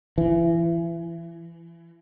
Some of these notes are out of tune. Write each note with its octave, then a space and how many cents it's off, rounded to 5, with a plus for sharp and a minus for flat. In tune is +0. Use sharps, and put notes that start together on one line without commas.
E3 +30